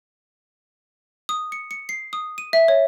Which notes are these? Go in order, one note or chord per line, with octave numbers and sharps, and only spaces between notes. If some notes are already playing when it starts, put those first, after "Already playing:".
D#6
C#7
C#7
C7
D#6
D#7
E5
C#5